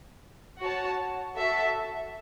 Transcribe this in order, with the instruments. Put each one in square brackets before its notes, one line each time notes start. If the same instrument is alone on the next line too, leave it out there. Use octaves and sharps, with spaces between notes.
[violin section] F#4 C#5 F#5 A5
F#4 A4 E5 A5